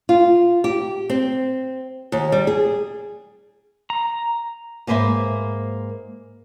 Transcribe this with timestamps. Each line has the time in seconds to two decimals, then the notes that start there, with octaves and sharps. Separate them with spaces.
0.09 F4
0.64 G4
1.10 C4
2.12 D#2
2.32 G3
2.47 G#4
3.90 A#5
4.87 G#2 A#3 B4 C5 E5